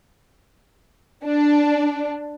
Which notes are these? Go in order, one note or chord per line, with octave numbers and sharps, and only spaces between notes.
D4